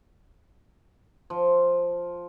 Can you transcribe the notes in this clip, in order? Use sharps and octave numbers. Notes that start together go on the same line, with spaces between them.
F3